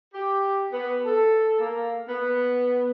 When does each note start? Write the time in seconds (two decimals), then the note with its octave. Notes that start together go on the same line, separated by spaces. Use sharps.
0.14 G4
0.72 B3
1.05 A4
1.59 A#3
2.08 B3